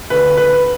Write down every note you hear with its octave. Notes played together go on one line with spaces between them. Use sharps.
D2 D3 B4
B4